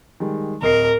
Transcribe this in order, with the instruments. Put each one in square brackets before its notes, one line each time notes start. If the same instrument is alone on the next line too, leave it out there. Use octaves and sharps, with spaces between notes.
[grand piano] D#3 G3 G#3
[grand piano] D1 D#5 C7 [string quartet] A#4